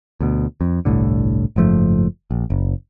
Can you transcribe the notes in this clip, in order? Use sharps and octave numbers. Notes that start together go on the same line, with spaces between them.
D2 B2
F2
G1 C2 A2 D3
F#1 G#2 F3 A3
A#1
F#1